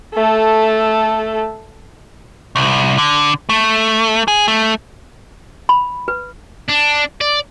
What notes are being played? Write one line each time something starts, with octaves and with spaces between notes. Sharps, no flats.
A3 A4
C2
D3
A3
G#4
A3
B5
B4
D4
D5